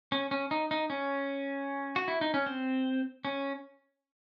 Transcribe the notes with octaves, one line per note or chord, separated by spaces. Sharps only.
C#4
C#4
D#4
D#4
C#4
F#4
E4
D#4
C#4
C4
C#4